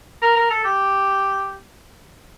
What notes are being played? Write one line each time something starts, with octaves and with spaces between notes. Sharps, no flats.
A#4
A#4
A4
G4